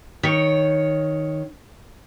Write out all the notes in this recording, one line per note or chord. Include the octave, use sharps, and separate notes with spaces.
D#3 C#5